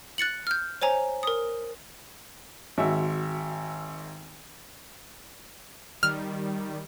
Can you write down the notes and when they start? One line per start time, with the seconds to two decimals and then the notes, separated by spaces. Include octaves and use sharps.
0.18 F#6 A6 C#7 F#7
0.47 F6 G6
0.82 C5 C#5 G#5 A#5
1.23 A#4 D#6
2.78 G#1 F#4 E5
6.03 D#3 G3 F6